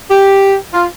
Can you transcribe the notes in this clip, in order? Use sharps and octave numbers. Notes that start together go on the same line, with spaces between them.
G4
F4